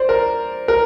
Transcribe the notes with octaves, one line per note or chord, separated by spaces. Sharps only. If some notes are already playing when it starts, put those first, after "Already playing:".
Already playing: C5 D5
A#4
A#4